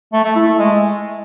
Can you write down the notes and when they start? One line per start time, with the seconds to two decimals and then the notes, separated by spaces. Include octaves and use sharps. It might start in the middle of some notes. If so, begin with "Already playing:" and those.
0.13 A3
0.24 A3
0.36 E4
0.47 A3
0.58 G#3